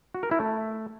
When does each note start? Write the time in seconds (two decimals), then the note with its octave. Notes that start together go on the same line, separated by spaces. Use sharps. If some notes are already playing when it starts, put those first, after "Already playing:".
0.15 F#4
0.23 A#4
0.31 E4
0.40 A3